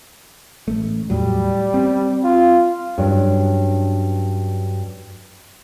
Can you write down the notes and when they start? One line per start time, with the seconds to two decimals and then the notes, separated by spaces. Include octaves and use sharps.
0.68 A1 A3
1.10 E2 A2 F#3 G3
1.74 C4
2.24 F4
2.98 G2 F#3 C#4 D4